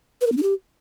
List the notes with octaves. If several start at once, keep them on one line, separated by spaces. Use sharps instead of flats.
B4
A#4
B3
D4
G4